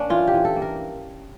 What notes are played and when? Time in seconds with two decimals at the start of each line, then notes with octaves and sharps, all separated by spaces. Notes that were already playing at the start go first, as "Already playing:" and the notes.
Already playing: A#3 C#4 D4
0.10 E3 F4
0.27 G4
0.34 E3
0.45 A4
0.56 A#3
0.62 A#4